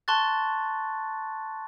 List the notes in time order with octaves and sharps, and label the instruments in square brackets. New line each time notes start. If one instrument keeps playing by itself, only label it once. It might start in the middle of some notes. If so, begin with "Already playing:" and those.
[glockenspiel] A5 C6 C#6 F#6 A6